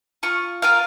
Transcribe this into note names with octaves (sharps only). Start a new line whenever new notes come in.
F4 C#6
F4 A#4 F5